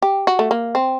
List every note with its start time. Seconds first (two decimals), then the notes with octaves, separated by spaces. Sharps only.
0.02 G4
0.27 F#4
0.39 A3
0.51 A#3
0.75 C4